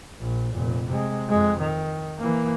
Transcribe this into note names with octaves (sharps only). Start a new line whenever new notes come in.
A#1
F1 A#2
C3 G#3
F2 G#3
D#3
E3 A#3